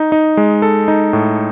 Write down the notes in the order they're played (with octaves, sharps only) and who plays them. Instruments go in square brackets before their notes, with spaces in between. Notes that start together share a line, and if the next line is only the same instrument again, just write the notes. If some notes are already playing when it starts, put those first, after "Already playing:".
Already playing: [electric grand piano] D#4
D#4
G#3
A4
D#4
A2